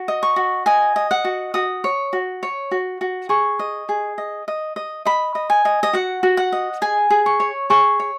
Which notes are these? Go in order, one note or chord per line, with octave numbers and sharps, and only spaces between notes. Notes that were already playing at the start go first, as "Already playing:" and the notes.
Already playing: F#4
D#5
C#6
F#4
D#5 G#5
D#5
F#5
F#4
F#4 D#6
C#5
F#4
C#5
F#4
F#4
G#4 C#6
D#5
G#4
D#5
D#5
D#5
D#5 B5
D#5
G#5
D#5
D#5
F#4 F#5
F#4
F#5
D#5
G#4 G#5
G#4
C#6
C#5
G#4 C#6
C#5